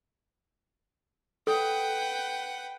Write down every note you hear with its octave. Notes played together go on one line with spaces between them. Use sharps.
A4 B4 F#5 G5